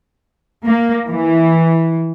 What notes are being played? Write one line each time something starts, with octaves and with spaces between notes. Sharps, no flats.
A#3
E3